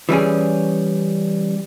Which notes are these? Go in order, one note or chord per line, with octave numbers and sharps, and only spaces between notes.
E3 G3 C#4 G#4